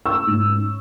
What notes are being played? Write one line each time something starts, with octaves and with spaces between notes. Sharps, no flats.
C#4 C#6 E6
G#2
C#4